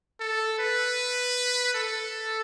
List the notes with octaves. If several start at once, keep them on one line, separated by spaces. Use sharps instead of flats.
A4
B4
A4